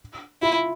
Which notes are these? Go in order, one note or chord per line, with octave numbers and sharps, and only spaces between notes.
E4 F4